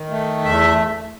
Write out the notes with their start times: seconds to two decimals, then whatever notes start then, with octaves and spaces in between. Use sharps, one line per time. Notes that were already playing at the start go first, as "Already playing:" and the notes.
Already playing: D#3
0.10 A3
0.44 E2 E5